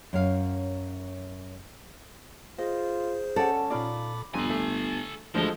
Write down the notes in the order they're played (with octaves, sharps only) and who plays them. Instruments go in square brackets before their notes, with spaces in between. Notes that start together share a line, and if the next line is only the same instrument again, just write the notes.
[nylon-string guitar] F#2 C#5 F5
[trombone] F4 [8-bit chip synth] G#4 C5 [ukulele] D#5
[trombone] C#4 [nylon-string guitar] A4 [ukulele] D5 F#5
[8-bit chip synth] A#2 B5 D6 [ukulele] D#4 F4 D5
[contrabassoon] G1 [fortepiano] F2 [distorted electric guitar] A4 G#5
[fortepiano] A3
[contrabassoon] D2 [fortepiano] F3 G#3 A4 [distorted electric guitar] E4 D#5